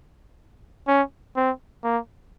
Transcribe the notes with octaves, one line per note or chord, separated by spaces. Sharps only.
C#4
C4
A#3